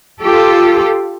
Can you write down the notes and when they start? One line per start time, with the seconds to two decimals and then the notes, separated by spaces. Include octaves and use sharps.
0.21 F4 G4 A4